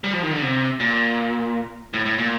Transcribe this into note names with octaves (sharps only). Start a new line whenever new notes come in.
G3
F3
D#3
D3
C3
A#2
A2
A2
A#2